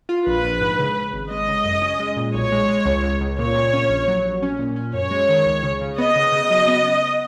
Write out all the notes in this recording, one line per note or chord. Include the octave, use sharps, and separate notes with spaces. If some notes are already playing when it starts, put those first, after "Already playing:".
F4
A#1 B4
A#1
G#2
C#3
C#3
G#1
G#3 D#5
C#3
F#2
C#4
G#3
A#2
B1 C#5
G#3
G#3
C#2
C#2
C#2
A#2 C#5
A#2
C#4
A#1
F#3
A#1
C#4
A#2
C#4
F#2 C#5
G#3
D#3
C#2
C#3
C#3
B3 D#5
C#3
C#3
F#3
B3
B3